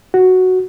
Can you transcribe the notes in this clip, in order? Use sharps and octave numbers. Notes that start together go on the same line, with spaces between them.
F#4